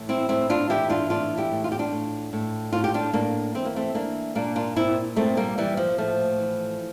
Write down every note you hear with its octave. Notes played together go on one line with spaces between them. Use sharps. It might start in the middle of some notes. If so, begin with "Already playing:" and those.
Already playing: A2 E3
C4 E4
A2 C4 E4
D4 F4
E3 E4 G4
D4 F4
A2 D4 F4
E4 G4
A2
F4
G4
D4 F4
A2
A2
A2 F4
G4
D4 F4
A2 A#3 D4
E3 C4
A#3
A3 C4
E3 A#3 D4
A#2 A#3 D4
D4 F4
A#2 C4 E4
A#2 A3 C4
G3 A#3
A#2 E3 G3
F3
A2 F3 A3
E3